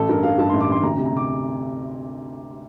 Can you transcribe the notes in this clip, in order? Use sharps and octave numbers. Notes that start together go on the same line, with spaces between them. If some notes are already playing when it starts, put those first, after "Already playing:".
Already playing: A1 A4
G2 A#4
G2 F5
G2 A5
A1 C6
D6
A1 C6
D2 A#5
C3
A#5
C3 D6